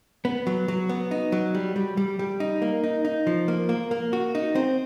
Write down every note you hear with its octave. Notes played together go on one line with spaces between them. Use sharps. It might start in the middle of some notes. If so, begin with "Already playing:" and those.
B3
F#3
F#3
B3
D#4
F#3
G3
G3
G3
G3
D#4
A#3
D#4
D#4
F3
A#3
A#3
A#3
F#4
D#4
C4